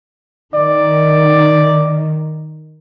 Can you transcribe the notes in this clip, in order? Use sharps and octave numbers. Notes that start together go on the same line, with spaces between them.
D#3 D5